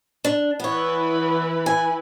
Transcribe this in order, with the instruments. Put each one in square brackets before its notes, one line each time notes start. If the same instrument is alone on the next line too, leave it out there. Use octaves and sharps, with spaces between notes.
[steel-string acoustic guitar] D4
[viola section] E3 E4 B4 [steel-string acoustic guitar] B3 C#5
[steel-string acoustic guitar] G#5